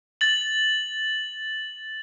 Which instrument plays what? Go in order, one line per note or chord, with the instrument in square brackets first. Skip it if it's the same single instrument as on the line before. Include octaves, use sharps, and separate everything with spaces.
[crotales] A6 F#7